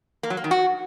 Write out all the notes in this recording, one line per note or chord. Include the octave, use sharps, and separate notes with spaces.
A#3
F#3
A#3
D#3
F#4